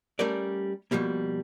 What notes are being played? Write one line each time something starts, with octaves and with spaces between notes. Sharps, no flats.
G3 A3 C#4 A#4 D5
B2 D#3 F3 G3 A#3